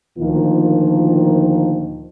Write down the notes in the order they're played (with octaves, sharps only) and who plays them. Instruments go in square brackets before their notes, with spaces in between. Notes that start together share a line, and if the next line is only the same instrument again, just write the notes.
[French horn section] D2 A#2 D#3 F3 A#3 F4